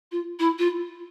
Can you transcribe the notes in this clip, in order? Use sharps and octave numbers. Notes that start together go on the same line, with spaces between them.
F4
E4
F4